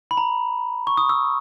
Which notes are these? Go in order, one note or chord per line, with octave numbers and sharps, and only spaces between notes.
B5
A#5
C#6
D#6
E6